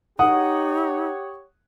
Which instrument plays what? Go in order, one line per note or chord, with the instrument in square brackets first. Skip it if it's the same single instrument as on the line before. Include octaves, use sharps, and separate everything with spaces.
[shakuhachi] D#4 [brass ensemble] G4 C#5 [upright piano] F#5 D#6